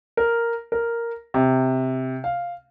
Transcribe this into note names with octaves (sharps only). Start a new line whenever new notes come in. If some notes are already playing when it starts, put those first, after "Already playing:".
A#4
A#4
C3
F5